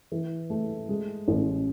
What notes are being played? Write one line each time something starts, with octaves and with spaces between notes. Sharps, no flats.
E3
A3
G#3
A1